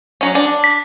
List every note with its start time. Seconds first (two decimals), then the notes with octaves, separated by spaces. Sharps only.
0.21 F#3 C#4
0.35 D4
0.64 B6